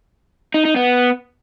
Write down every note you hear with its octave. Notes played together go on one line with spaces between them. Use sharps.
D#4
D#4
B3